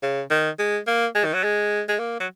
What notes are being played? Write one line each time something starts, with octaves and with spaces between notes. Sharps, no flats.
C#3
D#3
G#3
A#3
G#3
D#3
F#3
G#3
G#3
A#3
F#3